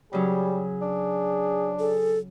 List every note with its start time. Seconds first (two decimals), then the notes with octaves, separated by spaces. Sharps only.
0.13 C#3 F#3 G3 G#4
0.82 D4
1.79 G#4 A4